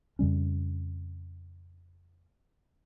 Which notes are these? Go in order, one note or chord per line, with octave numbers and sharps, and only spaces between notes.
F2 C#3 G3 C#4